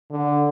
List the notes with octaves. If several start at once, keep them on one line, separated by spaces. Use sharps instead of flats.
D3